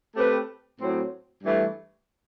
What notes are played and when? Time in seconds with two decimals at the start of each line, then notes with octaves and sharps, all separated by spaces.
0.15 A3 C4 G4 B4
0.80 A2 F#3 C4
1.43 G2 E3 A3